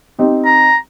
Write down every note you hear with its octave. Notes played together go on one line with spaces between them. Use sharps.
C4 D#4 G4
A#5